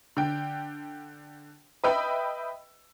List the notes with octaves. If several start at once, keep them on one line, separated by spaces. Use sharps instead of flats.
D3 G5
B4 D#5 E5 G5 B5